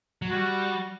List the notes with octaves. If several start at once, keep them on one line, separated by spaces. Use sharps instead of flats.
F#3
G3 F#4